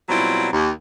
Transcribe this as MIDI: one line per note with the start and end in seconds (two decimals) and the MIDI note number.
0.09 0.47 47
0.09 0.47 54
0.09 0.47 55
0.09 0.47 60
0.09 0.47 64
0.09 0.47 65
0.52 0.69 39